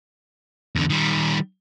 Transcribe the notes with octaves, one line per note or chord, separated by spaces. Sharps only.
E2 D3
D#3 G3